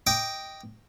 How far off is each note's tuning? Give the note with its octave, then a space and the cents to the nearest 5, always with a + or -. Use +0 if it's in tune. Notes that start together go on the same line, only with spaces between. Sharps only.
D#5 +0 G5 +0 D6 -10